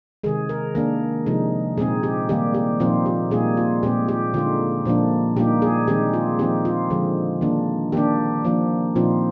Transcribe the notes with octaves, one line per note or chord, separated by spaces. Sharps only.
C3 D#3 G#3 G#4
A#4
D#3 A#3 D4 A#4
C3 F3 G#3 D#4
A#2 G#3 C4 D#4 G#4
G4
D#3 G3 A#3 G4
G4
A#2 F3 C4 D#4 F4
G4
A#2 G3 A#3 D#4 G#4
F4
A#2 G#3 C4 G4
G4
D3 G#3 D#4 F4
A#2 F3 A#3 D4
A#2 G3 A#3 D#4 G4
G#4
D#3 G#3 C4 D#4 G4
F4
F3 C4 D#4 G4
F4
D3 F3 G#3
D#3 A#3 D4
D#3 A#3 D4 G4
F3 A#3 D4
A#2 F3 C4 D#4 F4